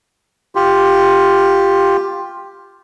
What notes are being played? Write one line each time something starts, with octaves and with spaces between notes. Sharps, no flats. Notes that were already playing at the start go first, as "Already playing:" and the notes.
F4 G4